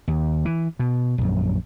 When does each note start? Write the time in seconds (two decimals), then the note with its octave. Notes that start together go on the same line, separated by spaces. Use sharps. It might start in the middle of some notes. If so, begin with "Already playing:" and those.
0.08 D#2
0.45 E3
0.79 B2
1.18 A#1 F#2